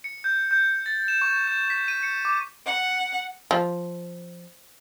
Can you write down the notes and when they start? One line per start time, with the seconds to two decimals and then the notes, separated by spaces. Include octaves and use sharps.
0.04 C#7
0.24 G6
0.51 G6
0.86 A6
1.08 E7
1.22 C#6
1.47 G6
1.70 B6
1.88 D#7
2.03 C#7
2.25 D6
2.66 F#5
3.51 F3